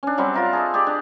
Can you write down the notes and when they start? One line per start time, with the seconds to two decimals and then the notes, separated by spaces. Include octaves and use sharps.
0.03 C#4 D4
0.18 F#3 G3 C4 D4
0.34 F4 A#4 E5
0.53 G#4 A4 D#5
0.74 G4 G#4 D5
0.87 D4